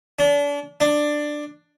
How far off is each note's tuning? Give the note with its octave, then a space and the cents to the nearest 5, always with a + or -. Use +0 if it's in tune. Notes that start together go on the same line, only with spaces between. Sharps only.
D4 -35
D4 +10